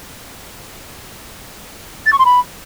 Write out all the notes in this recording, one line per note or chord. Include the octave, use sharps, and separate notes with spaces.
A6
C#6
C6
B5